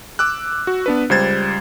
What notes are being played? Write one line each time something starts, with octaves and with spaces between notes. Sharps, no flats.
D6 E6 F#6
F#4
B3 D4 B4
C#2 G3 C5 G#6 A6